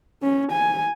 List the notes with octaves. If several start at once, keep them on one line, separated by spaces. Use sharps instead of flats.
C#4
G#5